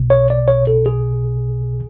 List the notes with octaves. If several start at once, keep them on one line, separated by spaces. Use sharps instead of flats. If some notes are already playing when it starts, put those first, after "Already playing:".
Already playing: B1 B2
C#5
D5
C#5
A4
G#4